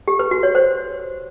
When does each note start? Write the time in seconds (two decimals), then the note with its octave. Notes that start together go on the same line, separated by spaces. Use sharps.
0.08 G4
0.19 B4
0.31 F#4
0.43 C#5
0.55 C5